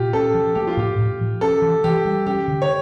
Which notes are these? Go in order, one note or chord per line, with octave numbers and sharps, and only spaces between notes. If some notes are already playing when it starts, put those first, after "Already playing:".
Already playing: A#2 F4 G4
C#4 A4
F3
A#3 G4
F4
A2 G4
A2
F3
C#4 A4
E3
E3 G4
G3
C#4 G4
D3
C#5